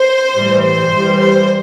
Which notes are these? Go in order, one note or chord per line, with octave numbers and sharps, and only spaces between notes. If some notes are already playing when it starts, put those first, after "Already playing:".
Already playing: C5
A2 E3 G3
C5
A2 E3 G3
C5